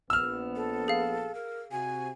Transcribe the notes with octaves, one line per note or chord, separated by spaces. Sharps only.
A#1 B3 E6 F6
A4
G#4 F5
A#4
C3 F#4 G#5